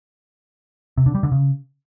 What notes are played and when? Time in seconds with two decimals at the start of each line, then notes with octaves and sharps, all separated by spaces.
0.97 C3
1.06 D3
1.15 G3
1.23 D3
1.32 C#3